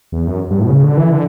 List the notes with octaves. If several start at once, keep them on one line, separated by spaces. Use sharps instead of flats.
E2
F#2
G2
A2
B2
C#3
D3
E3
D3